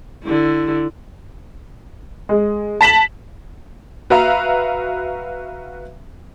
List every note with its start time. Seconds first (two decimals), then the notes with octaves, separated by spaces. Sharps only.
0.24 D3 E4
2.29 G#3
2.81 A5 B6 E7 F#7
4.10 F#4 B4 E5 F5 A#5